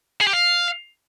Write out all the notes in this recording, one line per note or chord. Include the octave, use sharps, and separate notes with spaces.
G#4
G4
F5